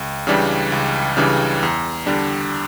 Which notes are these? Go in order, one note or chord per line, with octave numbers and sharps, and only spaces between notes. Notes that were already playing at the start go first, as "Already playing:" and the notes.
Already playing: C#2
C#3 E3 G3 D4
C#2
C#3 E3 G3 D4
E2
D3 G3 D4